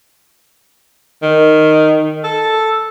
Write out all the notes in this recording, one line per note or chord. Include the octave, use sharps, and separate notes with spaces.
D#3
A4